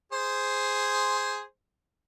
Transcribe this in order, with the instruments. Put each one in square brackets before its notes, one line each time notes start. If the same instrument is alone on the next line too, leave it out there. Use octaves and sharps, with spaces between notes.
[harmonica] G#4 C5